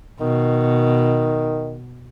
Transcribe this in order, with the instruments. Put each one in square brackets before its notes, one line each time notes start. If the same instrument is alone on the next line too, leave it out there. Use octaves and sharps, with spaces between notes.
[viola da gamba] B2 [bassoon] D#3